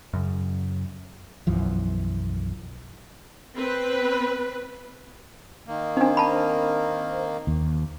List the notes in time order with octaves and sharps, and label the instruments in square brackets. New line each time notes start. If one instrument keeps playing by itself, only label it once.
[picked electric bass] F#2 C#3
[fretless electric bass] B1 F#2 E3 F3
[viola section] C4 B4
[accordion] D#3 A#3
[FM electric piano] C4 C5 [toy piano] D4 D#4
[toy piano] A5 B5
[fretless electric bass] D#2